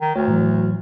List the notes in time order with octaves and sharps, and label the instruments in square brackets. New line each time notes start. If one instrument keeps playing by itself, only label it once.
[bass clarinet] D#3
[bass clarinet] D2 [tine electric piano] C#5
[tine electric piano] A2 E3 F#3